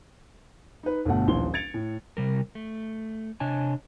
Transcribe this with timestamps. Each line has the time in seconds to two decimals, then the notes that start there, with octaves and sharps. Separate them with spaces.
0.83 D#4 B4
1.05 G1 B2 A3 F#5
1.28 D#1 A#1 E3 C6 G7
1.54 G#6 A6 C#7 D7 F7
1.74 A2
2.17 C3 G3 A#4
2.55 A3
3.40 C3 D4 C#5 D#5 G#5 A5